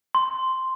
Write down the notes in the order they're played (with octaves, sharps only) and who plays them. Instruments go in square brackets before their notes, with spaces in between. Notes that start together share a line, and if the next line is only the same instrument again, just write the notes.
[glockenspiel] C6